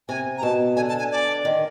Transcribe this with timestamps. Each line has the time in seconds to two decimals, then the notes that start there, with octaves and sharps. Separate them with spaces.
0.09 C3 G#5
0.38 A#5
0.43 B2 A5
0.76 D3 G#5
0.89 A5
0.99 G#5
1.12 D5
1.45 D#3